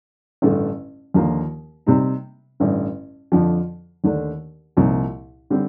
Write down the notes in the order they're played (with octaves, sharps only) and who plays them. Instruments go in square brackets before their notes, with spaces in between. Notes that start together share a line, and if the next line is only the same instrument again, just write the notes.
[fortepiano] A1 G2 D3 A3
D#2 D3 F3 A#3 F4
C3 G3 C4 D#4
A1 G2 D3
F2 D3 F3
D#2 D3 A3 D4
C2 A#2 F3 C4 D#4
D3 G3 C4